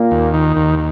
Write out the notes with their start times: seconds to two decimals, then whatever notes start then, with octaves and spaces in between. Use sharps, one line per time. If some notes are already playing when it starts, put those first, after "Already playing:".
Already playing: A#2 A#3
0.11 D#2
0.34 D#3
0.57 D#2